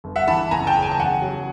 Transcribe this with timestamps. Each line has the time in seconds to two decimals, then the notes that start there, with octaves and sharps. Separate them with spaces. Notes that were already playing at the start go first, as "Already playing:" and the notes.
0.04 G1
0.16 E5 F#5
0.28 E3 A5 B5
0.51 F#1 G#5 A#5
0.67 G5 A5
0.75 C#3
0.82 G#5
0.91 A5
0.98 E2 F#5 G#5
1.22 F#3